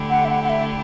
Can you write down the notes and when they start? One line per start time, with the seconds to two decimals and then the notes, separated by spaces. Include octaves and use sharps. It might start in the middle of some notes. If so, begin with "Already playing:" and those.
Already playing: D3 A3 E4 G4
0.10 F#5
0.25 E5
0.30 F#5
0.44 F#5
0.50 E5